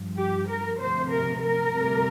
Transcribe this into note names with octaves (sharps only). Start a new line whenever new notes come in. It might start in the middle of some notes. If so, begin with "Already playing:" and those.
Already playing: G2 F3
G4
A#4
D2 C3 F3 C5
A#4
A#4
D2 C3 G3